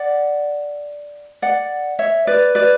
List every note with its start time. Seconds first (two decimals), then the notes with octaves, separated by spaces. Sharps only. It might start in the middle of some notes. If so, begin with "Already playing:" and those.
Already playing: D5 F#5
1.42 D5 F#5
1.99 C#5 E5
2.27 B4 D5
2.55 B4 D5